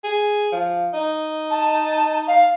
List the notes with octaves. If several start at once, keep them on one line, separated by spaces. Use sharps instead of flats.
G#4
F3
D#4
A5
F5